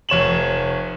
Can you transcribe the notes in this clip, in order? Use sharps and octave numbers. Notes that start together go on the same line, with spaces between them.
F1 C#5 E7 F#7